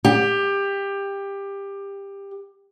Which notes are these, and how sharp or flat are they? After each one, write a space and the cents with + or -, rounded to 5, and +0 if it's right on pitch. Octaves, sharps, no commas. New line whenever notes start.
G4 +20